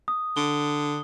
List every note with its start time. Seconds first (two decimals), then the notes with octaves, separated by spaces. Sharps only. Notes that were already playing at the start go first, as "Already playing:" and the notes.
0.08 D#6
0.37 D3 G7